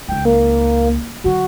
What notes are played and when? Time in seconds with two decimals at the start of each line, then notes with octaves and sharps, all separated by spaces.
0.08 C#2 D#4 G5
0.25 A#3
1.24 D3 F#3 F#4